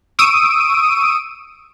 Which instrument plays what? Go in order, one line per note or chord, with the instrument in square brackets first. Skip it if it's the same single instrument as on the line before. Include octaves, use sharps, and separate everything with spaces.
[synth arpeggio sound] C#6 D#6 E6 D7 D#7